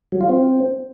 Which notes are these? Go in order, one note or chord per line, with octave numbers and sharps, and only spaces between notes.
F#3
F4
C4